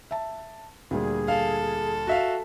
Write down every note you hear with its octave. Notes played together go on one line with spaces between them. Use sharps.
E5 A5
D2 A#2 G3 G#4
A4 F5
F#4 E5 F5